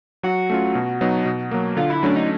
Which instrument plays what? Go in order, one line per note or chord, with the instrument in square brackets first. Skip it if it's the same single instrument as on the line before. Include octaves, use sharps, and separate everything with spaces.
[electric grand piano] F#3 [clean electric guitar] F#4
[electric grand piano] A3 C#4 F4
B2
F#3 B3 D#4
B2
F#3 A#3
[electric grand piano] D3 [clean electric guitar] F4
[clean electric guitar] E4
[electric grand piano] F#3 A3 C#4 [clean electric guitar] D4
[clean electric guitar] D#4